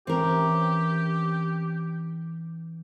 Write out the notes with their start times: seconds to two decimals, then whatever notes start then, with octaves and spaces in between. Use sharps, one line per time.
0.07 E3 C4 C#4 G4 A#4